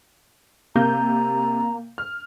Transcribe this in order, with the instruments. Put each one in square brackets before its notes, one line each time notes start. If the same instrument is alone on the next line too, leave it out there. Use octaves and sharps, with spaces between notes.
[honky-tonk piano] C3 G6 [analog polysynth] A#3 [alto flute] A#5
[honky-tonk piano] F6